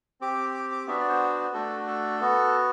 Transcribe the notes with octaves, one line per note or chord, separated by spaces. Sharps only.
C4 G4 D6
D6
D6
B3 D4 F#4 E5
D5
C5
A3 D4 F#4 A4
A4
B3 F#4